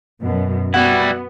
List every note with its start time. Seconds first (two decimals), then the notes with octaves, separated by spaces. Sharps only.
0.22 F#2 B2
0.74 G3 B3 E4 F#4